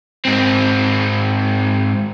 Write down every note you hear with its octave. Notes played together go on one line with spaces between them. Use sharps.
G#2 C4